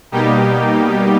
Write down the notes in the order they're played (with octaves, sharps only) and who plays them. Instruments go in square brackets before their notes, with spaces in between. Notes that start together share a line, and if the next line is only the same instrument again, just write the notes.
[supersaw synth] B2 G3 A#3 D#4 G4